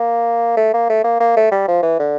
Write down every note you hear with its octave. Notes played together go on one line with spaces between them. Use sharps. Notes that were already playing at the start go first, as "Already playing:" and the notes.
Already playing: A#3
A3
A#3
A3
A#3
A#3
A3
G3
F3
E3
D3